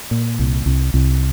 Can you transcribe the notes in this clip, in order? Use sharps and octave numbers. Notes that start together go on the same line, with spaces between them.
A#2
C2
C2
C2